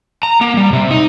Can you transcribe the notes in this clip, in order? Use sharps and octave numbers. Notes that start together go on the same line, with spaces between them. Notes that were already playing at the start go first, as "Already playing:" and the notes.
A#5
A#3
G3
C3
D#4